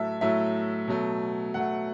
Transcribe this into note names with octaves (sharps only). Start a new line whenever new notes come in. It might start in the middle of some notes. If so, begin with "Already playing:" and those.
Already playing: A2 F#3 A3 E5 A5
A2 F#3 A3 E5
B2 F#3 A3
B2 F#3 A3 F#5